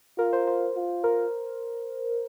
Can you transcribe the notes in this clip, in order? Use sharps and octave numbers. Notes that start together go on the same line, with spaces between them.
F4 A#4
C5
C5
F4
A#4